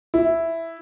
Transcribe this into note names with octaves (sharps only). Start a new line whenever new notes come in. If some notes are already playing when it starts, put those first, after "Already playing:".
E4